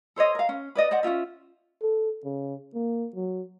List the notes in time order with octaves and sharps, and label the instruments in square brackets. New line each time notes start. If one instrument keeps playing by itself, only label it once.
[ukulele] A4 C5 C#5 D#5
A#4 F5
C#4
B4 D5 D#5
C5 D5 D#5 F#5
C#4 D#4 F4 E5
[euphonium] A4
C#3
A#3
F#3